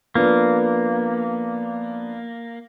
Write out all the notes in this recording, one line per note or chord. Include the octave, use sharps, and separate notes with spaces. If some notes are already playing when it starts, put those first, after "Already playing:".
F3 A#3 B3 D4